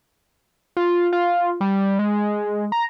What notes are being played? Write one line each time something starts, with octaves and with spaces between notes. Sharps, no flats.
F4
F4
G3
G#3
A#5